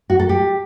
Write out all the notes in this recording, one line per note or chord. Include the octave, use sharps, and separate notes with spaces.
F#4
A4
G4